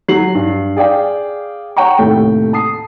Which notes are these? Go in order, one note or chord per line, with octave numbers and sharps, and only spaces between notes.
F#3 C7 F#7
G2
G#4 D5 F5 G5
C#5 F#5 G5 A#5 C#6
D#2 A2 C3 A3 G5
A5 D#6 C7